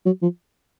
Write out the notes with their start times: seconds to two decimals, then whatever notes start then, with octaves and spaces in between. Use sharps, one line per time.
0.05 F#3
0.22 F3